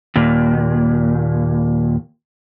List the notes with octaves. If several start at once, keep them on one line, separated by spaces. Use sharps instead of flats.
D#2 A#2